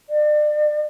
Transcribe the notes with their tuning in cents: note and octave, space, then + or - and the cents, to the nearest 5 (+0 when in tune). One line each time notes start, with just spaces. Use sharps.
D5 +40